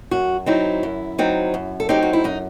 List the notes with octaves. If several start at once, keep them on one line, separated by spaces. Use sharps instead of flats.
F#2 F#4
F#3 C4 D#4 E4
F#2
F#3 C4 D#4
F#2
A4
F#3 C4 D#4 G4
F#4
E4
F#2 D#4